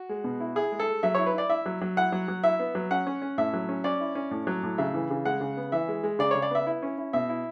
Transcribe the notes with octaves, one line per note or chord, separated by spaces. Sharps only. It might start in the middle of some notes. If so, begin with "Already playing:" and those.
Already playing: F#4
G#3
B2
E4
E4 G#4
G#3
A4
G#3
F#3 E5
E4 C#5
B4
E4 D5
E4 E5
F#3
F#3
E4 F#5
F#3
F#3
E4 E5
B3
F#3
C#4 F#5
C#4
C#4
A2 E5
F#3
C#4
C#4 D5
E4
C#4
A2
F#3
A2
C#3 E5
E3
C#3
G#3 F#5
C#3
B3
E3 E5
G#3
G#3
C#3 D5
C#3 C#5
D5
B3 E5
E4
C#4
E4
B2 E5
E4